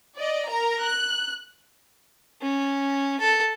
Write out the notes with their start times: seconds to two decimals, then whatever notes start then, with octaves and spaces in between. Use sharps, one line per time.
0.16 D5 D#5
0.48 A#4 A#5
0.82 F#6
2.41 C#4
3.20 A4